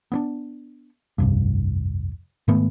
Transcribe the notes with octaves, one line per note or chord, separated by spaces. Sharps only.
B3 C#4 D4
F1 C2 G2
G#2 D#3 A3 B3